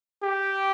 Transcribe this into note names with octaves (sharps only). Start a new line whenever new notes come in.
G4